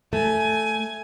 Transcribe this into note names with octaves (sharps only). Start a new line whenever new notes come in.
A3 G#5